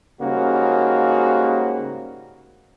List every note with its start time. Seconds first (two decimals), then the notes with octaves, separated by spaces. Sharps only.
0.21 G#2 C#3 G3 A#3 F#4